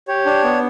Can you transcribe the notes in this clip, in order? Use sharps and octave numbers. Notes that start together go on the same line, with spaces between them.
G4 C#5
D4
B3